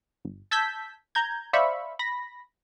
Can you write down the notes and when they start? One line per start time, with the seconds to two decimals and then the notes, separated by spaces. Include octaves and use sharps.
0.25 G1
0.51 A5 E6 G6 G#6 B6
1.15 A#5 G6 G#6
1.53 C5 D5 E5 F5 B5 C#6
1.99 B5 A#6